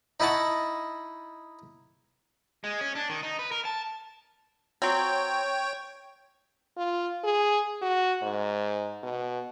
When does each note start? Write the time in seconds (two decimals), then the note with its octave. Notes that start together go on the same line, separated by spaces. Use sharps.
0.20 D#4 E4 D#5 F#5 A5 C#6
2.64 G#3
2.81 C#4
2.95 D4
3.09 D#3
3.23 D#4
3.39 B4
3.51 A#4
3.65 A5
4.82 F#3 C4 C#5 G5
6.77 F4
7.24 G#4
7.82 F#4
8.22 G#2
9.03 B2